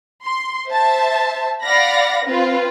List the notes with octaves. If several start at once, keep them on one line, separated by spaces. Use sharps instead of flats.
C6
C5 E5 A5
D5 F5 F#5 B5 A#6
C4 F4 B4